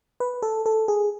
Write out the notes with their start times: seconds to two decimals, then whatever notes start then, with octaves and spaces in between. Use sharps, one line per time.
0.20 B4
0.42 A4
0.66 A4
0.88 G#4